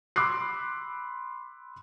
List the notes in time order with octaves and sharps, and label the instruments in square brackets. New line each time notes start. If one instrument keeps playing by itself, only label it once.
[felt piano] B5 C6 D6 E6 F#6 C7